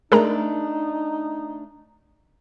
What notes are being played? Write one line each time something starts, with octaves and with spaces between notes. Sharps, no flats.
A3 D4 D#4 G#4 A#4 D5 A#5